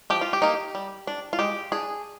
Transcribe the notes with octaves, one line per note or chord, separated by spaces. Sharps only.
F3 G4
F4
G4
A#3 D#4
G3
D4
F4
G#3 G4
D4 G#4